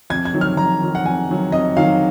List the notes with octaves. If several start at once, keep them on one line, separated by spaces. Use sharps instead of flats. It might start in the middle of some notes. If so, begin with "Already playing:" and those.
F2 G#6
G#6
D#3 F#3
F6
F2 A#5
D#3 F#3
F#5
F2 G#5
D#3 F#3
F2 D#5
D#3 F#3 F5